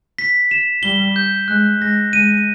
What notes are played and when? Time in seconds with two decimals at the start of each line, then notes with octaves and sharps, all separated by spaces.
0.19 B6
0.51 E7
0.83 G3 G7
1.16 G6
1.48 G#3 F#6
1.81 G#3 A#6
2.13 G#3 D#7